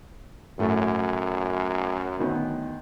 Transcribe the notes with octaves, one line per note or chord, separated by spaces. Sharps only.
F#2 A2 A3
D2 D#3 B3